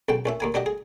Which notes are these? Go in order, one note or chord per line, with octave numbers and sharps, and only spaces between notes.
B1 C#3 G5
A#1 C#4 E5
D#2 A#3 G#5
F#3 D4 G4 D#5
G#4